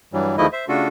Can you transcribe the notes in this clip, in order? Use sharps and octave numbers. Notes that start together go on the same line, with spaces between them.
G2 E3 F#3 G3
E2 D#3 F3 A3 E4 D#5
C5 E5
C#3 A3 D4 F4 F#4 A4